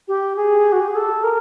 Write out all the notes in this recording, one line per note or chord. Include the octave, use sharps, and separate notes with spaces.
G4
G#4
F#4
G4
G#4
A4
A#4